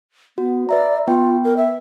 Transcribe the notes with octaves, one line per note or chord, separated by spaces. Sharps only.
B3 F#4
B4 D5 E5 A#5
B3 F4 B4 G5
A#4
E5